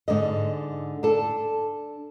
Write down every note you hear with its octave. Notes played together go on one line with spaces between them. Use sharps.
G#2 D3 D#5
D4 A4